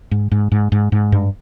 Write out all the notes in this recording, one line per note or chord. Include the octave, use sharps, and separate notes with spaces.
G#2
G#2
G#2
G#2
G#2
G2